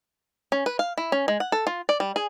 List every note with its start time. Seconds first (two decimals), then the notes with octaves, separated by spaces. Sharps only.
0.52 C#4
0.66 B4
0.79 F5
0.98 E4
1.12 C#4
1.28 G#3
1.40 F#5
1.52 A4
1.67 F4
1.89 D5
2.00 G3
2.16 G#4